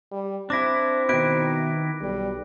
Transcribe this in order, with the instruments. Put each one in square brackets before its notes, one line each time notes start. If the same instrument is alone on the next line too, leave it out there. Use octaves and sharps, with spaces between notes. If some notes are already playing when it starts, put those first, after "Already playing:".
[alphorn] G3
[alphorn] C4 [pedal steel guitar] D4 E4 [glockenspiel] D6 A#6
[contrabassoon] B2 [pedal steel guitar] D#3 E4 [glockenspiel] F#6 D7
[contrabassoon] B1 [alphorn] G3